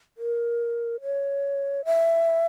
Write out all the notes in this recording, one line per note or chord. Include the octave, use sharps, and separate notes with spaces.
A#4
C#5
E5